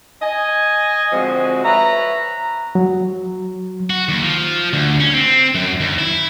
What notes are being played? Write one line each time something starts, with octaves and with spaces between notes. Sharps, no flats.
D#5 G#5
D3 F3 G#3 C4 F#4 G#4
B4 C#5 E5 A#5
F#3
F#4
D#2
F3
D2
C#4
C4
F#2
D#2
E4